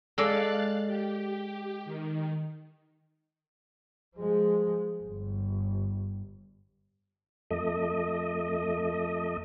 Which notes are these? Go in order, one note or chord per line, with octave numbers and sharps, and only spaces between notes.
G#3 A4 D5 F5 F#6 A6
G4
D#3
F3 G#3
G1
F2 A3 D#5